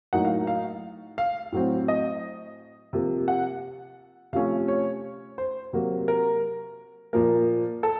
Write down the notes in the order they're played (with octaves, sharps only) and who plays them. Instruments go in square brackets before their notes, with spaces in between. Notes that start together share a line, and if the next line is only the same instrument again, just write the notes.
[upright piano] A2 F#3 A#3 D#4 F#5
F5
F5
F5
A2 F#3 C4
D#5
C3 F3 A#3
F#5
C3 F3 A3 C#4 F5
C#5
C5
C3 F#3 A#3
A#4
A#2 F3 A#3 A#4
A4